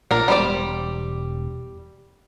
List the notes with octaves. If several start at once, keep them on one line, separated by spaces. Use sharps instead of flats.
A#1 D4 A#4
E1 G3 C5 D5